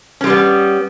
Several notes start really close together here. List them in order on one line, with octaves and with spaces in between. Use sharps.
C#4 G#3 G3 B3